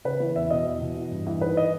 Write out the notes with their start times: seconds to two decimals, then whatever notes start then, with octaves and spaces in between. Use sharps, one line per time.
0.05 C#3 B4
0.20 E3
0.36 E2 E5
0.50 B2 D#5
0.66 E2
0.81 B2
0.97 E3
1.11 G2
1.27 E3
1.41 D#3 B4
1.57 D#5